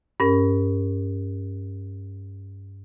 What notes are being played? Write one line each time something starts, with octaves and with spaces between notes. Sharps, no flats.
G2 C#4 A#4